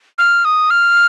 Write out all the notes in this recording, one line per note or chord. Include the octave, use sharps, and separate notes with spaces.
F6
D#6
F6